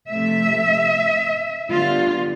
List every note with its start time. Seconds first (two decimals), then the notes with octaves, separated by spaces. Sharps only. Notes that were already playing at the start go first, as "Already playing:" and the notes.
0.10 C3 F3 A3 E5
1.70 D3 G3 B3 F4